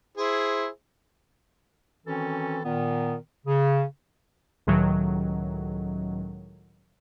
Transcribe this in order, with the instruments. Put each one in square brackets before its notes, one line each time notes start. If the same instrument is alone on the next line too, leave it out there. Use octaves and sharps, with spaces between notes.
[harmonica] E4 G#4 C5
[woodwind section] D#3 E3 C4 C#4 F#4 A4
A#2 D#3 B3
C#3
[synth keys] C#2 A2 D#3 F#3